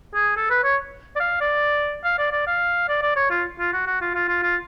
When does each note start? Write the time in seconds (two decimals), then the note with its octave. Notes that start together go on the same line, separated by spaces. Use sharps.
0.15 G#4
0.37 A4
0.50 B4
0.64 C#5
1.16 D5
1.20 F5
1.41 D5
2.04 F5
2.18 D5
2.32 D5
2.47 F5
2.89 D5
3.02 D5
3.16 C#5
3.31 F4
3.60 F4
3.73 F#4
3.87 F#4
4.02 F4
4.15 F4
4.29 F4
4.43 F4